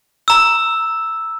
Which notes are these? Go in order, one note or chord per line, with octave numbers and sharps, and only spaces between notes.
A#5 E6